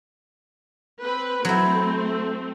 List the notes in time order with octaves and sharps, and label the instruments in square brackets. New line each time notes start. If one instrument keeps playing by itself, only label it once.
[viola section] C4 B4
[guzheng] F#3 E4 [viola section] A3 C4